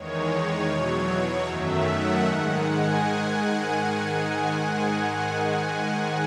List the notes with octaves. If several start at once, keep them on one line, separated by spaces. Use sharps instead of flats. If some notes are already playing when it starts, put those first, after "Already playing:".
Already playing: E2 D#3 G#3 C#5
C#5
E2 B2 F#3
F#2 D#3 F#3 A3 E5
F#5
G#2 D#3 G#3
G#5